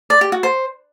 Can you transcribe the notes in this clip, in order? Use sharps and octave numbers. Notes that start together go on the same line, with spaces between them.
D5
G4
F#4
C5